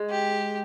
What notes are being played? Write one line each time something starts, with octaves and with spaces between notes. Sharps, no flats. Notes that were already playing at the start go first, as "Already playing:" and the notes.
Already playing: G#3
G4